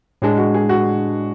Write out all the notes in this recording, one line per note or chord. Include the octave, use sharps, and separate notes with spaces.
A2 G#3 D4 G#4
F#4
G#4
F#4